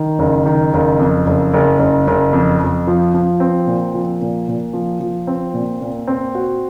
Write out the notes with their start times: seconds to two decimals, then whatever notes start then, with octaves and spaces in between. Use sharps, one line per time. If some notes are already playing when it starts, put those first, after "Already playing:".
Already playing: D#3
0.19 F#1
0.46 D#3
0.74 F#1
0.99 F2
1.27 F#1
1.54 F#1
1.79 F#1
2.07 F#1
2.33 F2
2.60 F2
2.87 F3
3.14 F3
3.40 C4
3.67 A#2
3.94 F3
4.21 A#2
4.48 A#2
4.73 F3
5.00 F3
5.27 C4
5.54 A#2
5.81 A#2
6.07 C4
6.35 F#4